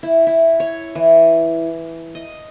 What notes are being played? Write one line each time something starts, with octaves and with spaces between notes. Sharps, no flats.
E4
E4
C#5
E3
D#5